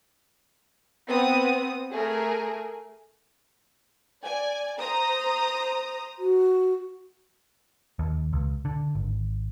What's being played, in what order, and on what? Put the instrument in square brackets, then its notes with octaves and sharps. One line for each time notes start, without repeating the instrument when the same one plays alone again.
[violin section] B3 C4 D#6
A3 G#4 A#4
D5 G#5
C5 A#5 D#6
[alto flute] F#4
[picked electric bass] D#2
C#2
D3
G#1